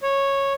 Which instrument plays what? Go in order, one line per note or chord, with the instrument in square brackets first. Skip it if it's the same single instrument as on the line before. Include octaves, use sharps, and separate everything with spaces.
[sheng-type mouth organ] C#5